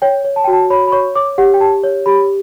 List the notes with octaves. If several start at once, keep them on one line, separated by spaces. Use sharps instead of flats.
C#5 G5
C#5
A5
F#4 G5
A5
C#5 B5
B5
C#5 C#6
C#5 D6
G4 F#5
G5
G4 A5
C#5
G4 B5